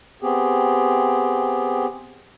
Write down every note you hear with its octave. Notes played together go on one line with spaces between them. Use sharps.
B3 C4 G4 G#4